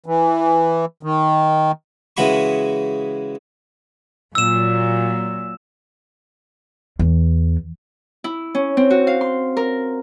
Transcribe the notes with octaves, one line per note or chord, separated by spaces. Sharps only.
E3
D#3
C#3 E3 G#3 F#4 B5 C#6
A#2 F#3 E6 E7
E2
E4
C#4
C4
F#4
F5
C6
A#4